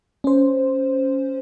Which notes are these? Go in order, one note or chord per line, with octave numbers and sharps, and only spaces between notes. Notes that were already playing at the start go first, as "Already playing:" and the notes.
C#4 C5